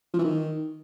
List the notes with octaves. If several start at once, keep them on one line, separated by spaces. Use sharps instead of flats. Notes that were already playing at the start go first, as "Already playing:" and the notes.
F3
E3
D#3